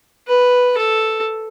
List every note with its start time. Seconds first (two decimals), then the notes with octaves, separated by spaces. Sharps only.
0.28 B4
0.78 A4